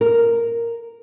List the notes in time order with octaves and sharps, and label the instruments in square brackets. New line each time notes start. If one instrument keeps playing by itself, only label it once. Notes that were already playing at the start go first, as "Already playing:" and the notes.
[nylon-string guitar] A#4